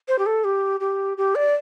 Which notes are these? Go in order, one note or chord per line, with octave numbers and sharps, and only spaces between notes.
C5
G4
A4
G4
G4
G4
D5